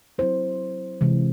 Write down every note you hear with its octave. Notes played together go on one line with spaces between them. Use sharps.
F#3 C4 E4 C5
C3 E3 G#3